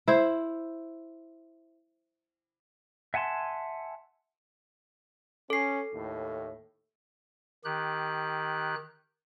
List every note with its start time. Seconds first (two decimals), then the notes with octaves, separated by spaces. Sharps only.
0.08 E4 C5
3.14 E5 F#5 G#5 A5 C6
5.50 C#4 A4 C7
5.94 D#2 A2
7.65 D#3 G4 F#6